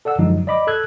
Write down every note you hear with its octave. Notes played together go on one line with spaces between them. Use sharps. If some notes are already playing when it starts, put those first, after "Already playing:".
A4 D5 F#5 E6
F#2 D3 F3 F#3 G#3 D#4
D5 D#5 B5 D6
A4 E6 F#6 G#6